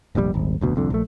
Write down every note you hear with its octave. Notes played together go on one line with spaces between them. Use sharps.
F1 A#1 B2 G3
D#1 G#1
F1 D2 B2
C2 F2 D3
A#1 A3